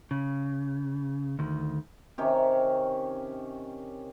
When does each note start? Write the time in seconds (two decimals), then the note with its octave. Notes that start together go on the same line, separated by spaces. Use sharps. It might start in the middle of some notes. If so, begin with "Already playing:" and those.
0.11 C#3
1.39 D2 D#3
2.18 C3 D#3 C#4 G4